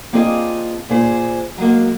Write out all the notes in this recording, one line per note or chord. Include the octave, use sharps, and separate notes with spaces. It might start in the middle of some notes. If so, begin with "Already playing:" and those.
A#3 C4 D4 F4 G#4 D#5
A#2 G#4 C5
F#3 G#3 A#3